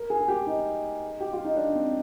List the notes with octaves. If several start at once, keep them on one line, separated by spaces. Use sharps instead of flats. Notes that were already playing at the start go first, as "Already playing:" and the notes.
Already playing: A#4
G#4
G#4
G4
D#4
G4
F4
D#4
D4
C4